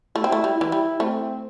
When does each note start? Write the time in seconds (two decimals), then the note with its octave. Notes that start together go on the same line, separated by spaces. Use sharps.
0.16 A3 E4
0.24 C4
0.32 A3
0.44 G3
0.58 E3 E4
0.72 G3
1.00 A3 C4